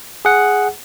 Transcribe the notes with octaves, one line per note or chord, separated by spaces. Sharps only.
G#4 F#5